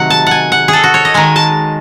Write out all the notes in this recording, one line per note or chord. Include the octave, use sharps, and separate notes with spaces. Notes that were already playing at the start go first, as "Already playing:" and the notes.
Already playing: C3 D#3 F#3 A3 F#5
A5
F#5 G#5
F#5
G#4
A4
F#4
C#5
D#5
D#3 G#3 G#5
A5